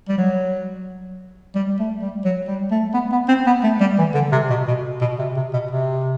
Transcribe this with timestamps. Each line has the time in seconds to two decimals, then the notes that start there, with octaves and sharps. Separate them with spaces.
0.09 G3
0.18 F#3
1.55 G3
1.80 A3
2.02 G3
2.25 F#3
2.48 G3
2.71 A3
2.94 B3
3.12 B3
3.28 C4
3.46 B3
3.64 A3
3.80 G3
3.98 E3
4.14 D3
4.32 C3
4.50 B2
4.67 B2
5.01 B2
5.19 C3
5.37 C3
5.53 B2
5.71 C3